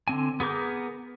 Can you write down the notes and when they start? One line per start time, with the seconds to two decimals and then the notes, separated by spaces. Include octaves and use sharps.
0.08 D3 C4 G#5
0.40 B3 G#4 A#4 D6 G6